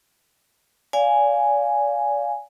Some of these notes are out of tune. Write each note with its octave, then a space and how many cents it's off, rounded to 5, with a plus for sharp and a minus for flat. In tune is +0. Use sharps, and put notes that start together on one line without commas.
D5 -30 F5 +0 G#5 +0